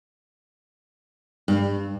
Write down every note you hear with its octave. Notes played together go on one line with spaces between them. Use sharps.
G2